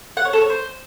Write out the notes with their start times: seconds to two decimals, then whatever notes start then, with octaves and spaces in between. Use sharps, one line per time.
0.17 F#5
0.25 C#5
0.33 A4
0.41 C#5
0.50 C5